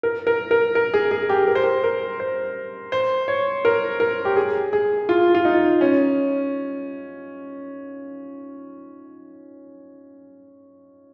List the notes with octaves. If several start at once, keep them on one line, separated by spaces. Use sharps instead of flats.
A#4
A#4
A#4
A#4
G#4
G#4
G4
A#4
C5
A#4
A#4
C5
C5
C#5
A#4
A#4
G4
G#4
G#4
F4
F4
D#4
C#4